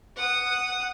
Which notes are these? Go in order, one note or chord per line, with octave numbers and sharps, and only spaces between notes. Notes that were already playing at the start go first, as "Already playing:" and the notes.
F#5 D#6